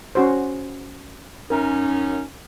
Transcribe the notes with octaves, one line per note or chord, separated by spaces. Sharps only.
C#4 F#4 C5
F#2 C#4 D#4 A#4